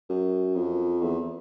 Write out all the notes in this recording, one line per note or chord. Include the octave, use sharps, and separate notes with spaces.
F#2
F2
E2